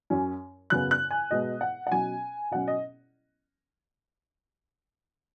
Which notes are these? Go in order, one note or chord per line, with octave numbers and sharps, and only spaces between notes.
F#2 F#3 C#4
F#2 C#3 B3 F#6
F#6
G#5
B2 G#3 B3 D#5
F#5
F#5
B2 F#3 C#4 G#5
B2 F#3 C#4 F#5
D#5